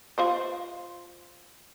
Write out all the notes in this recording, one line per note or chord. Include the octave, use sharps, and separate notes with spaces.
F4 C5 D#5